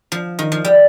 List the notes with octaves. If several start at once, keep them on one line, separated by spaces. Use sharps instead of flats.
F3
D#3
F3
G3